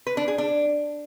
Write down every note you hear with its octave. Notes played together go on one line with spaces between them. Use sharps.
B4
D4
G#4
D4